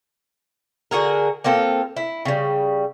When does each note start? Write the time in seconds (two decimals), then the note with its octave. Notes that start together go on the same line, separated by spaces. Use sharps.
0.91 D3 F#4 G#4 A#4
1.44 A#3 C4 F4 A4
1.97 E4
2.25 C#3 G3